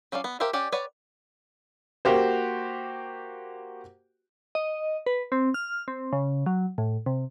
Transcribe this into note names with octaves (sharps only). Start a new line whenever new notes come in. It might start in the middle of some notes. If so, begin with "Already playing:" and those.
F#3 C#4 F4 D5 F5
B3
G4 A#4 C5 E5 F5
C#4 G4 D5 F#5
B4 C#5 D5 F#5
A#3 F#4 G4 C5
D#5
B4
C4
F6
C4
C#3
F#3
A2
C3